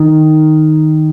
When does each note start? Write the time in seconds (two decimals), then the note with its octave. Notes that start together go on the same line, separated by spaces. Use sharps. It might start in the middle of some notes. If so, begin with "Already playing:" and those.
Already playing: D#3